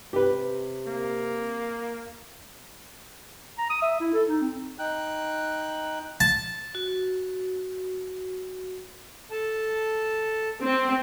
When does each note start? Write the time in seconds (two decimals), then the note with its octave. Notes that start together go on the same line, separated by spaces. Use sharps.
0.13 C3 G4 B4
0.88 A#3
3.58 A#5
3.70 D#6
3.82 E5
4.00 E4
4.14 A4
4.29 D#4
4.41 C4
4.79 D#4 G5 F#6
6.20 A5
6.75 F#4
9.31 A4 A5
10.61 C4